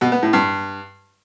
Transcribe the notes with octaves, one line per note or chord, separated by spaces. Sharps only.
B2
B3
A2
G2